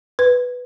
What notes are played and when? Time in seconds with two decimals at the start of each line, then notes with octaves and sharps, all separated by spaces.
0.19 B4